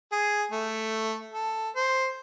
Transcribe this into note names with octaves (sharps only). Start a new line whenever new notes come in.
G#4
A3
A4
C5